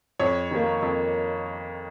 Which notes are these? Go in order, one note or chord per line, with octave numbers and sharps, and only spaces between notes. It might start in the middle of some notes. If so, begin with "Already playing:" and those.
F2 C#5
D#3 A#3
F2